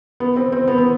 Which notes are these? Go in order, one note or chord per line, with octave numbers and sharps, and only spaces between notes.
B3
C4
C4
B3
B3